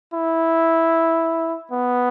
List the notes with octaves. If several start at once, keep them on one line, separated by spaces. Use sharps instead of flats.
E4
B3